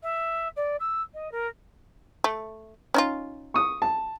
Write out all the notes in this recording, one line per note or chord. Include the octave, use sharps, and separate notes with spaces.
E5
D5
E6
D#5
A#4
A3
C#4 D#4 F4
C#6 D#6
A5